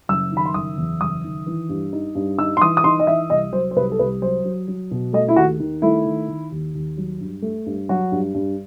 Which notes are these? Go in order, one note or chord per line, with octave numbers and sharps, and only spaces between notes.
F#1 E6
D#3 B5
C6
F#1 D#6
E2
F#1 D#6
D#3
E3
G2
D#4
G2
D#4 E6
C6
E3 D#6
D#6
D#4 C6
D#5
E3 E5
C2 D#5
F#3 C5
C5
C2 B4
A4
C2 B4
F#3 C5
F#3
F#3
B2
A3 D#5
E4
D#2 F#4
D#3
A3 E4
D#3
D#3
D#2
D#2
F#3
G2
A3
G2
F#3 F#4
G2
G2